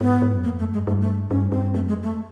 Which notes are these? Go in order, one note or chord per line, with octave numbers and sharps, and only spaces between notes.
G#2 B3
G#2
F#2
F2 A#3
F#2 A3
G2 G#3
G2 A3
A3
G2 C#4
G2 C4
F#2 A3
G#3
F2
A3